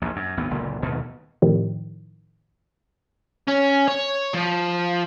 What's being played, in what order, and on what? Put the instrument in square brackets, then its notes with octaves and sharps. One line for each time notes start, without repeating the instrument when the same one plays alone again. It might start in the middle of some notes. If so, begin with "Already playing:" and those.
[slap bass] A#1 D#2
F#2
G#1 D2 B3
F#1 C#2 A#2 D3
F1 D#2 B2 D#3
[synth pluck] A2 C3 D#3 F3
[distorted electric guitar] C#4
C#5
F3